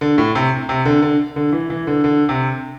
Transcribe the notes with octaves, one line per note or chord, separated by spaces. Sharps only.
D3
A2
C3
C3
D3
D3
D3
E3
E3
D3
D3
C3